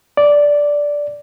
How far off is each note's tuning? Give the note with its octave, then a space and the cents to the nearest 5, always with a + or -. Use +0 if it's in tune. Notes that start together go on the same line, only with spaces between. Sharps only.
D5 -5